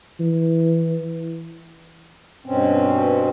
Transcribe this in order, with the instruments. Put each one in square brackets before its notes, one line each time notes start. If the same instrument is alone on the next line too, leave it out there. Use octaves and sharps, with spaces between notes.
[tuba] E3
[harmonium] G2 B2 C4 C#4